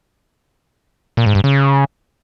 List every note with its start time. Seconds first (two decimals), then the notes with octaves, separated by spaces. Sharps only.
1.17 A#2
1.26 G#2
1.35 G2
1.44 C#3